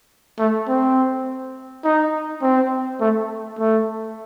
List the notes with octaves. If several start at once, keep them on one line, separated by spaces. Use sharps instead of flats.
A3
C4
D#4
C4
A3
A3